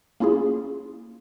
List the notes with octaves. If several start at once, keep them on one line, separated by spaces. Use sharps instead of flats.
A#3 C#4 E4 F4 G#4